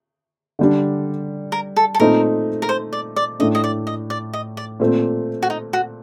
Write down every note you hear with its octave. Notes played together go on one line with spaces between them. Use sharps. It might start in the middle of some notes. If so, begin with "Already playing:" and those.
D3 G3 D4
A#4
A4
A4
A#2 A3 C4 D#4 A#4
A#4
C5
D5
D5
A2 A3 D4 D#5
D#5
D5
D#5
D5
D#5
D5
A#2 A3 C4
F#4
D#4
F#4